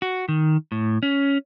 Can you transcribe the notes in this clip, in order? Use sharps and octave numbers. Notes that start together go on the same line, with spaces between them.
F#4
D#3
A2
C#4